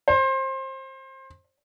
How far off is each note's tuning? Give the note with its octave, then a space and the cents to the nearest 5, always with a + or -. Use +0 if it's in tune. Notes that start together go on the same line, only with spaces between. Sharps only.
C5 +25